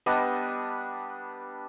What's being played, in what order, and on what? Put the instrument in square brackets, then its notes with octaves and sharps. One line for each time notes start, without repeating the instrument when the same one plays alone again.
[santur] G3 B3 D4 D#5